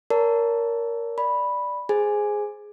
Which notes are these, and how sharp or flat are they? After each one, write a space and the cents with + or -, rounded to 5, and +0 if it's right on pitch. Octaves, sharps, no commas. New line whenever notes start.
A#4 +0 C#5 +40 A5 +5
D5 +0 B5 -5
G#4 +0 C5 +0 G#5 +0